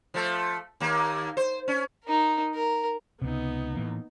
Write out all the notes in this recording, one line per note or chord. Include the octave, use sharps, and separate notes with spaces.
F3 A3
D#2 A#3
C5
C#4
D#4 A#4
A#4
C#2 C3 B3 D#4
A2 E3 A#3